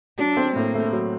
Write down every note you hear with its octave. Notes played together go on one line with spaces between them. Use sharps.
F#3 D4
C4
A2 A#3
A3
F#3